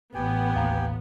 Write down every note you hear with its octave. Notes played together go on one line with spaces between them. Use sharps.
A1 B3 G4 G5 G#5
D#2 F5 A#5